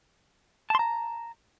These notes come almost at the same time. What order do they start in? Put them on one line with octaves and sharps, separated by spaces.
A5 C6 A#5